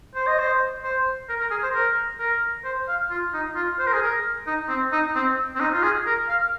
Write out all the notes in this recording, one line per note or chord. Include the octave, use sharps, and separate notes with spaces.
C5
D#5
C5
C5
A#4
A#4
G#4
C5
A#4
A#4
C5
F5
F4
D#4
F4
C5
A#4
G#4
A#4
D#4
C4
D#4
C4
C4
D#4
F4
G#4
A#4
F5